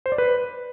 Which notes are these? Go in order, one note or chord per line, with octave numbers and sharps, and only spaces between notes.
C5
D5
B4